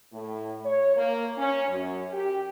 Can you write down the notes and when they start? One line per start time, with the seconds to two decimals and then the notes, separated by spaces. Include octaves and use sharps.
0.12 A2
0.64 C#5
0.95 A#3
1.37 C#4
1.68 F#2
2.13 G4